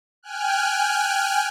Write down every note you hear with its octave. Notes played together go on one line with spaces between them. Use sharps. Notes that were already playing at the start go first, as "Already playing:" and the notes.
G5 G#5 F6 F#6